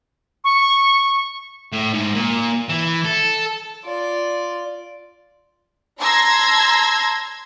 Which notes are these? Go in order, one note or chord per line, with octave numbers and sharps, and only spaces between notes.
C#6
A2
G#2
A#2
E3
A4
F4 D5
A5 A#5 C6 E6 G#6 A#6